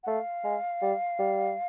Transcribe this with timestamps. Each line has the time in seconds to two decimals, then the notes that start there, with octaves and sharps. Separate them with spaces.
0.03 F#5
0.07 A3 F5
0.45 G#3
0.82 G3
1.19 G3